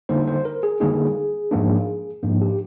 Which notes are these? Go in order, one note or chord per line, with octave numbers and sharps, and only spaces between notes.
D3 G3 A#3 D#4 C5
C5
A#4
G#4
D3 G3 A#3 D#4 G#4
G#2 F3 A#3 D4
G#2 F3 A#3 D4
G4